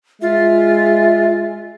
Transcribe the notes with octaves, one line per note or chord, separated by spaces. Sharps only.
G#3 F4 E5